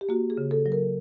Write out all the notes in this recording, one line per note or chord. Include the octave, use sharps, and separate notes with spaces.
G4
A#3 F#4
G#4
C#3
A4
F#3
A#4